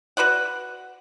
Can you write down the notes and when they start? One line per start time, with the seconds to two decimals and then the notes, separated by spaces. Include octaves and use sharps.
0.17 F#4 B4 D5 F#5